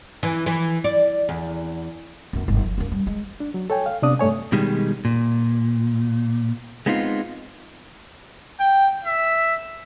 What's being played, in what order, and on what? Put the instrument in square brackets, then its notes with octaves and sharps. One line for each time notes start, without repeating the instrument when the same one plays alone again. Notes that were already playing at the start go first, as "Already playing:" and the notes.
[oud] E3
E3
D5
E2
[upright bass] F#2 B3
G1 G#2
F3
F#2 A#3
G3
G#3
[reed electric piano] D4
F#3
A4 C#5 G5 G#5
F5
C3 B3 D4 D5 D#6
G2 A3 C#5 G#5
[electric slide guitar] B2 D#3 G3 G#3
A#2
G#3 B3 C4 D#4 F4
[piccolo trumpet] G5
E5